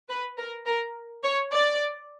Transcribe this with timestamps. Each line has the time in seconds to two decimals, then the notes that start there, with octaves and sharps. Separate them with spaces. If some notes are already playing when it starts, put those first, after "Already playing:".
0.09 B4
0.38 A#4
0.66 A#4
1.24 C#5
1.52 D5